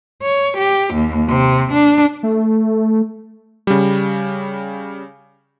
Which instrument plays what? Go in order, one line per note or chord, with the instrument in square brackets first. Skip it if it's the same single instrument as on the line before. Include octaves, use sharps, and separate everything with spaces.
[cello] C#5
G4
D#2
C3
D4
[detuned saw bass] A3
[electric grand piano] C#3 G3